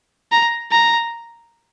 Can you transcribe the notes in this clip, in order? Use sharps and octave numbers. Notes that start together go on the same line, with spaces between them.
A#5
A#5